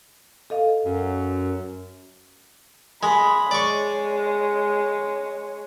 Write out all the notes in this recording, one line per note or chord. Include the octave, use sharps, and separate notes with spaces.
A4 D#5 F5
F#2
G#3 B5
G#3 C#5 D5 C#6